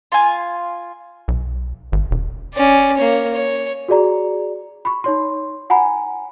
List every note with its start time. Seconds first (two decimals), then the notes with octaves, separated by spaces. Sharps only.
0.12 F4 G#5
1.28 B1
1.92 G#1
2.11 E1
2.54 C#4 D5
2.97 A#3 C#5
3.33 C#5
3.88 F#4 G#4 D5 A#5
4.85 B5 C#6
5.04 D#4 C#5 C6
5.70 F#5 G#5 A#5 B5